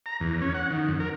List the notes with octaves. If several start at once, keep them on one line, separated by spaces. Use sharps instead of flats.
A#5
E2
C#4
F#5
D#3
F2
A#4